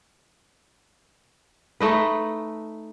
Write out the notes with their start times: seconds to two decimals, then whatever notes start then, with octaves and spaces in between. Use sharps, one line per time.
1.80 A3 D#4 B4